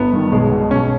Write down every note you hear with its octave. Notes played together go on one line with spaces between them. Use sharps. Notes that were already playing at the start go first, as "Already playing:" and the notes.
Already playing: G1 B3
G2 D#3
B1 G#3
B2
B1 C#4